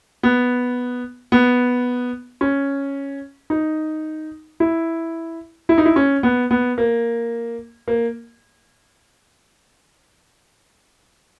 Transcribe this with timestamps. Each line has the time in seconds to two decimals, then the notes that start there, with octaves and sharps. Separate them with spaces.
0.23 B3
1.32 B3
2.41 C#4
3.50 D#4
4.60 E4
5.69 E4
5.78 D#4
5.85 E4
5.96 C#4
6.23 B3
6.51 B3
6.78 A#3
7.88 A#3